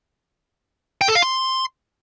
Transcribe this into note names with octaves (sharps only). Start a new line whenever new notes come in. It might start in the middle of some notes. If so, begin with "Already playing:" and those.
G5
A4
F5
C6